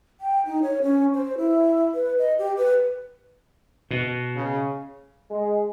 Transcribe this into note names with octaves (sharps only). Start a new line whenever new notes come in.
G5
D#4
C#5
C#4
C5
E4
B4
D#5
G4
B4
B2
C#3
G#3